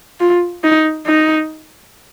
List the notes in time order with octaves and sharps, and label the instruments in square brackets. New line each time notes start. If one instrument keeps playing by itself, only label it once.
[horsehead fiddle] F4
D#4
D#4